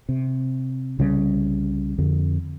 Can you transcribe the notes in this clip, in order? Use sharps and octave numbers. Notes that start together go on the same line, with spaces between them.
C3
C2 C#3 G3
F2 D3